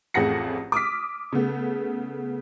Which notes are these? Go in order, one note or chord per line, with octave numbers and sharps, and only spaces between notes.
A1 F2 G#4 F#5 A#6 C#7
D6 D#6 F6 B6
C#3 A3 B3